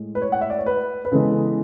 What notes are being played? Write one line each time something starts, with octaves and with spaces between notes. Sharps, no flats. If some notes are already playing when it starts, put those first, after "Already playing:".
Already playing: A2 G#3
B4
C#5
F#5
E5
D5
C#5
B4
B4
C#3 E3 G#3 B3 A4